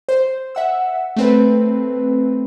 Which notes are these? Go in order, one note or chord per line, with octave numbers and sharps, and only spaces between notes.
C5
E5 F#5 E6
A3 C4 B4